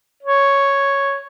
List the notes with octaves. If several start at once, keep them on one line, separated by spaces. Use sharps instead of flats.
C#5